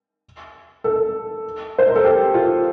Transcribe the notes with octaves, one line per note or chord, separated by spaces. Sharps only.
A4
C5
A#4
A4
G4
F4